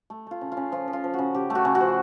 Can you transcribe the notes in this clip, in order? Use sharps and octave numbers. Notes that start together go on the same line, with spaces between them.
A3
A3 F4
C#3
F4
C#3
F3 F4
F3
F4
F3
F#4
C#3
C#3 G4
A3
F#4
C#3
F#4
F3